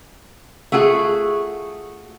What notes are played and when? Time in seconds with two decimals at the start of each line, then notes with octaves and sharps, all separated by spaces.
0.72 A3 F4 F#4 G#4